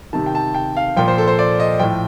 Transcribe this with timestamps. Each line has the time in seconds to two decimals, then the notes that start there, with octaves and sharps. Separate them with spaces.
0.13 C3 D#3 A5
0.26 G5
0.35 A5
0.55 G5
0.77 F5
0.96 A#2 F3 G5
1.08 C5
1.18 A4
1.28 C5
1.39 D5
1.60 D#5
1.79 A2 F3 G5